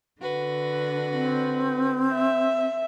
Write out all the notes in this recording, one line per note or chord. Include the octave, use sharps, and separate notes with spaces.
D3 F#4 B4
C4
E5